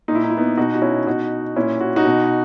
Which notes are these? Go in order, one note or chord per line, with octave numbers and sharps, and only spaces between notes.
A#2 D#4
E4
D#4
E4
B3 D#4
B2 D#4 F#4
F#4
C#4 E4
B2 D#4 F#4
A#2 C#4 E4
F#4
D#4 F#4
B2